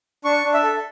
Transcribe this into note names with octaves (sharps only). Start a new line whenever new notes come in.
D4 C#6
D4
E5
A4